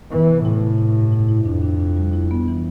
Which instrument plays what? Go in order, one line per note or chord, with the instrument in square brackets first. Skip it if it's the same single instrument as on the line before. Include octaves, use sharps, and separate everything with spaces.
[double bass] E3 [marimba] B3
[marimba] C3
[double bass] A2 [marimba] E4
[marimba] C3
E4
G2
E4
E4
[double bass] F2 [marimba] D4
[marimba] D4
D4
G3
E4
B3
E3